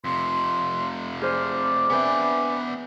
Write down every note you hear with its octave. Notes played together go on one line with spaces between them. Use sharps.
F2 C3 C6
G#4 C5 D5 F6
B3 G#4 B4 E5 G5 G#5